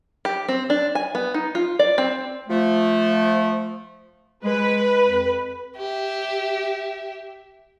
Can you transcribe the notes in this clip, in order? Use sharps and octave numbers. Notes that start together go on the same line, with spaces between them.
G4
C4
D4
G#5
B3
D#4
F4
D5
C4
F3 A3
G#3 B4
F2
G4 E5